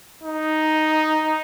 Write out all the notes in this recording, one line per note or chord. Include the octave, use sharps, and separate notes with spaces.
D#4